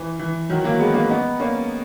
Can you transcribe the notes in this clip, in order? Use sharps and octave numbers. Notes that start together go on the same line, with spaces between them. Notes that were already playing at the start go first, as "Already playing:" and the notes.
Already playing: E3
E3
D#3 F#3
F#3 A#3
G#3 B3
A#3 C#4
B3 D#4
A#3 C#4